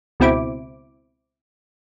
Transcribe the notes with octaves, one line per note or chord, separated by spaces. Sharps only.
C#2 B2 C4 E4 D6